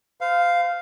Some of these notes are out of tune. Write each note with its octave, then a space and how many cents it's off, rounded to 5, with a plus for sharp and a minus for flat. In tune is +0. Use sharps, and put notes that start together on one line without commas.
C5 -35 F5 +0